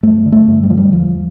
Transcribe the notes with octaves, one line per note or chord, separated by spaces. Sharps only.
G2 A3
D3
A3
G2
G3
D3 F3
G3
E2 F3